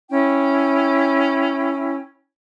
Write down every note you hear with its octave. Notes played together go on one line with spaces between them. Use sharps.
C#4 E4 G5